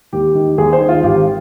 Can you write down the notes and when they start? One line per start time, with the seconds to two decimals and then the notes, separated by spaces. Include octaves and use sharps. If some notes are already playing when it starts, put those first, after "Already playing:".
0.13 D#2 G4
0.35 D#3
0.58 D#2 G#4
0.73 C5
0.81 D#3
0.89 F4
1.04 G#1 G4